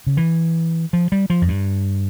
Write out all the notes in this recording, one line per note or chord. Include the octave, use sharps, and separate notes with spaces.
C#3
E3
F3
G3
F3
F2
G2